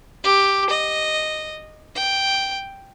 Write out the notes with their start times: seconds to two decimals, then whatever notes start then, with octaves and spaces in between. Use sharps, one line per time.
0.24 G4
0.70 D#5
1.95 G5